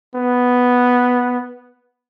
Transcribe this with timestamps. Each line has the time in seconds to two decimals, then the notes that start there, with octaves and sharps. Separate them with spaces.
0.16 B3